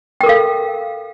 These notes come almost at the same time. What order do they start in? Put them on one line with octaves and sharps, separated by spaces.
G5 A#4 A4 F5